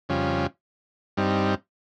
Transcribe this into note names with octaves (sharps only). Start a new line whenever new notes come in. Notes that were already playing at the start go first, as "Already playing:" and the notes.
F2 C#3 G3 C#4 F4
G2 G3 C4 D#4